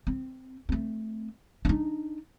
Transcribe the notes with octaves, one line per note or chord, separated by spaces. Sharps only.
C4
A3 C4
D4 D#4